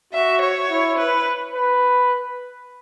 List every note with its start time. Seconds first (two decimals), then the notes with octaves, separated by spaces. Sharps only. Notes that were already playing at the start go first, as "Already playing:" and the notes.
0.13 F#4 E5
0.41 C#5
0.70 E4
0.98 B4
1.54 B4